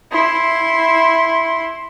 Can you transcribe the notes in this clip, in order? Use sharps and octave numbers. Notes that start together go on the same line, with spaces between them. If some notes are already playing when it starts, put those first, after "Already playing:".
E4 C6